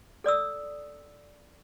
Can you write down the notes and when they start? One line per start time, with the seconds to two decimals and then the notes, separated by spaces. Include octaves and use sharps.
0.24 A4 D5 D#6 E6